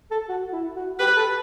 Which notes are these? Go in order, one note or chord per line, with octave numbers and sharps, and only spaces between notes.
A4
F#4
E4
F#4
G4 B4
A4